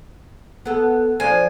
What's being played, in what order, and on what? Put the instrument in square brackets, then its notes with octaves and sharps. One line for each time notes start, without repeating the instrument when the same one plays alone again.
[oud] B3 A4
[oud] F3 D4 C5 [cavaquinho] G#5